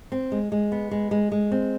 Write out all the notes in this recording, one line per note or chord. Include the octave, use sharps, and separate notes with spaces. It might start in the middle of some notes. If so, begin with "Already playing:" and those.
C4
G#3
G#3
B3
G#3
G#3
G#3
C4